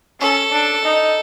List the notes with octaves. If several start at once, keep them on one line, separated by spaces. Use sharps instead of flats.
C#4 A4
D4
D#4